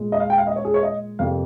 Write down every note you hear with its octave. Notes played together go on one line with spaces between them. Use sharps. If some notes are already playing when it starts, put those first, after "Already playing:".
Already playing: A#2 G#3
D#5
F5
G5
F5
D#5
C#5
G#4
C#5
D#5
F2 C3 G3 A#3 F5